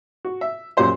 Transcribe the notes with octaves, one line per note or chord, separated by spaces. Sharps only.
F#4
E5
F#2 A#2 F4 G4 C5 C6